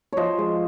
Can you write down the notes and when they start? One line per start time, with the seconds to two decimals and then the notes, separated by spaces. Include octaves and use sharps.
0.13 F3 C5 C#5 D#5
0.38 G#3